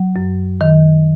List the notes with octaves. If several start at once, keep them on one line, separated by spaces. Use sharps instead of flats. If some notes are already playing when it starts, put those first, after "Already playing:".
Already playing: F#3
F#2
D#3